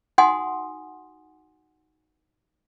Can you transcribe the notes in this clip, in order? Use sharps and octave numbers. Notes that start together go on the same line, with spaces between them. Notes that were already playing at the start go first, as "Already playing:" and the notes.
D#4 F#4 F#5 G#5 C6 D#6